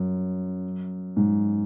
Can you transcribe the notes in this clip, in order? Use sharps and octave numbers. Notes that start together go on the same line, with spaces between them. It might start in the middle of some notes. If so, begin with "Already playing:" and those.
Already playing: F#2
G#2